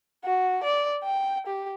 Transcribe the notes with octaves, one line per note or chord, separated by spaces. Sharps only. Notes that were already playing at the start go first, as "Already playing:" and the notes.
F#4
D5
G5
G4